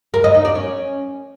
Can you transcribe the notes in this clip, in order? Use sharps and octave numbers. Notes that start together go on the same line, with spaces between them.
A#4
D#5
D#4
D5
C#4